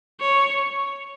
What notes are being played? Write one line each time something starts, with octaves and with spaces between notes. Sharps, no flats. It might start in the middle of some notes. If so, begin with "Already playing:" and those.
C#5